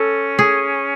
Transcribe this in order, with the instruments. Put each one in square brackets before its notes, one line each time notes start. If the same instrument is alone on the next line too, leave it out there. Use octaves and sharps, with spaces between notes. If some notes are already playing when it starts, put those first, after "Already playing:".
Already playing: [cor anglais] C#4 [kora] A4
[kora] G#4